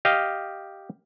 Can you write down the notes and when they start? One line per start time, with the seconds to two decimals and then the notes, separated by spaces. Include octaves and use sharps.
0.05 G4 D#5 F5